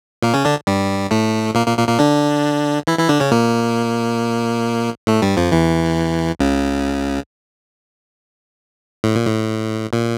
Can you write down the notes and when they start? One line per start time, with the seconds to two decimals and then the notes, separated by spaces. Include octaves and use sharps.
0.22 A#2 A#3
0.33 C#3 C#4
0.45 D3 D4
0.67 G2 G3
1.11 A2 A3
1.55 A#2 A#3
1.66 A#2 A#3
1.78 A#2 A#3
1.88 A#2 A#3
1.99 D3 D4
2.87 E3 E4
2.98 E3 E4
3.09 D3 D4
3.20 C#3 C#4
3.31 A#2 A#3
5.07 A2 A3
5.22 G2 G3
5.37 F2 F3
5.52 E2 E3
6.39 C#2 C#3
9.04 A2
9.15 A#2
9.26 A2
9.93 A#2